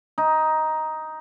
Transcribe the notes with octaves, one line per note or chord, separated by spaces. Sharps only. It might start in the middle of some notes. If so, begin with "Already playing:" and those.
D#4